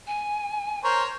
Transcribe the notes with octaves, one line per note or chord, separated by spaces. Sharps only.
G#5
A#4 C5 C#5 A#5